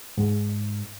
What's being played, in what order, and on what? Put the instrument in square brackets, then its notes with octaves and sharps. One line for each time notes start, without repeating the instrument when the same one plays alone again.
[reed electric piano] G#2